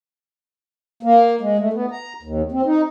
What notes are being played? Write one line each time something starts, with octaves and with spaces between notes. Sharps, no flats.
A#3
G#3
A3
B3
A#5
D#2
C4
D#4